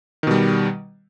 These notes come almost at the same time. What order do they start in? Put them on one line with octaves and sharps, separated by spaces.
D#3 B2 G3